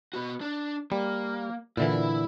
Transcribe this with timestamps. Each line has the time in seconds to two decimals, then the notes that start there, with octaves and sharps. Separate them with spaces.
0.13 B3 F#4
0.41 D4
0.92 G3 A#3
1.77 A#2 D3 E3 E4 E5